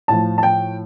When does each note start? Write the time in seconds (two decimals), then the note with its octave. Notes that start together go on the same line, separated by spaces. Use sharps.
0.08 A2 F3 A5
0.38 A5
0.43 G5